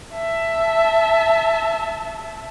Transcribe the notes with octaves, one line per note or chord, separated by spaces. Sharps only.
E5 A5